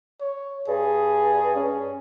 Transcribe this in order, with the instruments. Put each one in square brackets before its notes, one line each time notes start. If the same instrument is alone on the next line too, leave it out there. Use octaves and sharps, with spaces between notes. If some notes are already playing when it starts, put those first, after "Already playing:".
[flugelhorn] C#5
[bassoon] G2 [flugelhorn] G#4
[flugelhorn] C#4